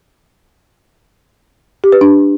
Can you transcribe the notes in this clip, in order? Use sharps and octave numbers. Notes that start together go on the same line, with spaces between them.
G4
B4
D4